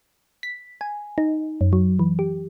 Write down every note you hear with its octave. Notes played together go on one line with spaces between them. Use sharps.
B6
G#5
D#4
F#2
F#3
E3
G4